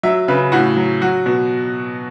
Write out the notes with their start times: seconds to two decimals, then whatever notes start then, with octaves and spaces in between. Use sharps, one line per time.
0.03 F#3 E5
0.28 C#3 B4
0.52 A2 F#4
0.77 F#3
1.02 F#3 F#4
1.26 B2